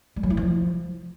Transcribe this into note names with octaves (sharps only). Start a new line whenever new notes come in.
G3
F#3
E4
F3